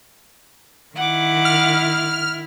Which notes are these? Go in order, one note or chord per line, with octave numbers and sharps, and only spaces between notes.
D#3 E4 F#5 D6
F6